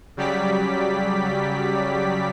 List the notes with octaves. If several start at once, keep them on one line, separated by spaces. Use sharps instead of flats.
C#3 F#3 G3 G4 D5 B6